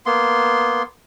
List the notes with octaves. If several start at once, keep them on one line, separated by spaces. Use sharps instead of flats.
A#3 B3 C6